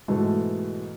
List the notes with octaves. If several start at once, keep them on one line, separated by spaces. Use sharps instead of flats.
G#2 B2 E3 G#3 A3